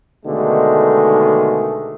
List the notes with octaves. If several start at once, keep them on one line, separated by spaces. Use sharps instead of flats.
B2 D3 D#3 G#3 A3